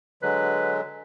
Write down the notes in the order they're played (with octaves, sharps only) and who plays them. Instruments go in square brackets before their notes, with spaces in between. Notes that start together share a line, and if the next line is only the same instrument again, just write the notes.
[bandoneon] D3 F#3 G#3 [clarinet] B4